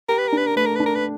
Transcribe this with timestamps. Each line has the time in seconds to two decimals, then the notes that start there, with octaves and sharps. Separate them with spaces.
0.08 G4 A#4
0.18 B4
0.27 A#4
0.32 D4 B4
0.46 A#4
0.56 A3 B4
0.66 A#4
0.75 D4 B4
0.86 A#4
0.95 B4